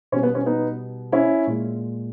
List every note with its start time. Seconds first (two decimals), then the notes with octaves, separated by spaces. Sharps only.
0.12 B2 C#4
0.16 G3
0.23 B3
0.35 C#4
0.46 B3 D#4
1.12 C#4 E4
1.47 A#2 G#3